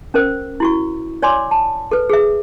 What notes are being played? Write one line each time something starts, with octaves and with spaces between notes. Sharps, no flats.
C#4 A#4 C5
E4 F#4 C#6
C#5 D5 G#5 C6 D6
A5
A4 B4
G#4 E5